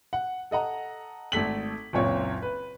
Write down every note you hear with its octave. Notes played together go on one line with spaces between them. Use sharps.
F#5
A4 D#5 F#5 A#5
G#1 A3 A4 B6 F#7
F#1 C#2 A#2 C4 C#5 C#6
B4